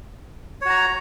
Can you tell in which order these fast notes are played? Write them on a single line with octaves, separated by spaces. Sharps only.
C#5 F#4 A#5